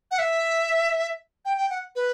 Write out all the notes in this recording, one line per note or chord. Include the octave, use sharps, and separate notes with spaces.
F#5
E5
G5
G5
F#5
B4